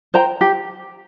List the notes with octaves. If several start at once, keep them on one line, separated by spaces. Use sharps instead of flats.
C5 G5 A#5
G4